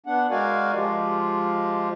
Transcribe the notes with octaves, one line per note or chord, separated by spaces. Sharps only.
B3 D4 F#5
G#3 F#4 A#4 D5 F5 G#5
F3 G#3 F4 G4